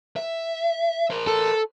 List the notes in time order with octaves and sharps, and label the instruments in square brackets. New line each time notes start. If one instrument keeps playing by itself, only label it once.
[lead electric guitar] E5
A#4 C5
[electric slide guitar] A4